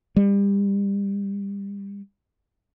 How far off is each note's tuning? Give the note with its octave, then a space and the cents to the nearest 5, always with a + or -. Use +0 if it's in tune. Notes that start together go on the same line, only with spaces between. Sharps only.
G3 +30